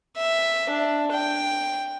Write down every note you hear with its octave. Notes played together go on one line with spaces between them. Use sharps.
E5
D4
G5